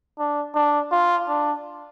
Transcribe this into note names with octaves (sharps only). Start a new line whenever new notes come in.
D4
D4
F4
D4